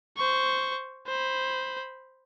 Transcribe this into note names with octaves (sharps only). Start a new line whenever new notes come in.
C5 C#6
C5 B5